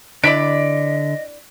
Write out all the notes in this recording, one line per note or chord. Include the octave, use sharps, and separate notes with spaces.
D3 D4 E4 D5 D#5 B6 D7